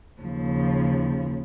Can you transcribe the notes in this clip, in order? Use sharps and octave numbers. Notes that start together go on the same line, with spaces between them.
D#2 C#3 F3